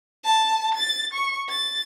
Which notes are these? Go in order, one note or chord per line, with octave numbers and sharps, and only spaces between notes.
A5
A6
C#6
A6